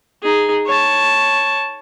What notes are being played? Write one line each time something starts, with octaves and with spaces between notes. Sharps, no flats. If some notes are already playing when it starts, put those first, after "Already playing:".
D#4 G#4
C#5 A5